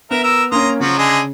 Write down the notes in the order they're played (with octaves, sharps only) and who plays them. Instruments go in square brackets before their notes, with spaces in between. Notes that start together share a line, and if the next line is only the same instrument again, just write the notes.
[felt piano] B3 [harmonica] A#4 E5
[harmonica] A#4 E6
[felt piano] A#3 C#4 [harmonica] A#5 C6 D#6
[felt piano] C#3 [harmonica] F3 F#3 F#4
[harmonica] D3 G#4 D#5